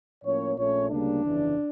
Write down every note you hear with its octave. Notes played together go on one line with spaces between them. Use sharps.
A2 F3 A#3 C#4 C#5
A#1 A#2 A3 C#4 C#5
D2 C#3 G3 A#3 D4
G1 F2 C#3 E3